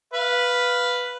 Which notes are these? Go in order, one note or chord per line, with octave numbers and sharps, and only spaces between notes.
B4 F5